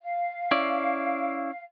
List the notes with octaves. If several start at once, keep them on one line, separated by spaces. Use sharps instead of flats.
F5
C#4 E4 D5